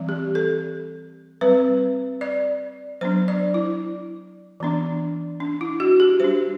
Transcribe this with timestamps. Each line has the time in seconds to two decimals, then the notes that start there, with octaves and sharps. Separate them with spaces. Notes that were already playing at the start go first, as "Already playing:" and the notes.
Already playing: E3 G3 C4
0.09 G4
0.35 A4
1.41 G3 C4 B4
2.21 D5
3.01 F#3 B3 D4 C5
3.28 D5
3.54 E4
4.60 E3 B3 D4
5.40 D4
5.61 E4
5.80 F#4
6.00 G4
6.20 G3 D4 C5